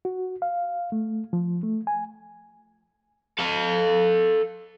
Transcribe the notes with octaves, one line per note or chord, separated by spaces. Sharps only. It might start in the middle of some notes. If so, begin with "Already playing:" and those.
F#4
F5
A3
F3
A3
G#5
A4 F5